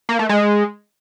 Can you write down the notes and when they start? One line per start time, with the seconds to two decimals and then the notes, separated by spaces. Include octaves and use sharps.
0.09 A#3
0.19 A3
0.29 G#3